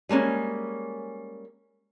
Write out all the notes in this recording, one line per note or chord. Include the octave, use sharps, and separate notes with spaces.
G3 G#3 A#3 C#4